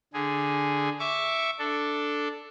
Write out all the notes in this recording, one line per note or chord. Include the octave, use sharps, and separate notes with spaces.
D3 G#4
E5 C#6 D6
D4 A4